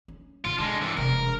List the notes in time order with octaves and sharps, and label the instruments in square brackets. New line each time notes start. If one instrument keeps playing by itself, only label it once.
[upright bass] C#4
[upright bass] D3 [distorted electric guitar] F4
[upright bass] D3 [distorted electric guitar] G#3 D4
[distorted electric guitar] G2 E3
[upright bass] E1 C3 [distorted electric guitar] A#4